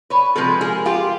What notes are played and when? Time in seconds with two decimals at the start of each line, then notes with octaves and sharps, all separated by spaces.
0.10 B4 C#5
0.36 C3 F3 G#3 A4 B4
0.61 G#4 A#4
0.86 F4 G4